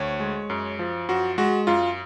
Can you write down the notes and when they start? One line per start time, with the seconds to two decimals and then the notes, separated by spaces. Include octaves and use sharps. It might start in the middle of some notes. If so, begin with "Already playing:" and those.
Already playing: D2 C#5
0.20 G#3
0.50 F#2
0.79 F3
1.09 F#2 F#4
1.38 G#3 F#4
1.67 F#2 F4